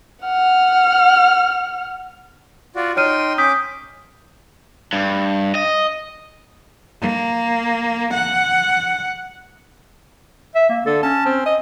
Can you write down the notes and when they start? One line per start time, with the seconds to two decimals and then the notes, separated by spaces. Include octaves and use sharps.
0.23 F#5 F6
2.76 F4 F#4 D5
2.97 D#4 C#5 G5 C6 F6 D#7
3.38 C#4 D6 D#6 G6 B6
4.93 G2
5.55 D#5
7.02 A#3
8.14 F#5
10.55 E5
10.69 A#3
10.86 D3 A4
11.03 C#4 A5
11.26 C4
11.46 D#5